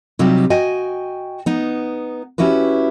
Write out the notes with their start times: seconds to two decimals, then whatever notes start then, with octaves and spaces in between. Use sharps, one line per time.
0.19 C3 F#3 G3 D#4 F4 G4
0.50 F#4 D#5 G5 G#5
1.46 B3 D#4
2.38 C#4 E4 F#4 G4 B4